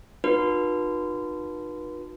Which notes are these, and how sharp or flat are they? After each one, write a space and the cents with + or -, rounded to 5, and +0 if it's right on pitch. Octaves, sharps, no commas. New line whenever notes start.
D#4 -20 F#4 -45 B4 -35